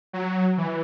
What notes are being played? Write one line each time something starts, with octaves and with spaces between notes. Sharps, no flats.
F#3
E3